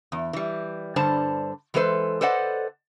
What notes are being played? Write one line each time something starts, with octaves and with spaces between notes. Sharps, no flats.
E2
E3 G3
G2 D3 G3 C5 A5
E3 G#3 A4 B4 C5
A4 B4 C5 D5 D#5 F#5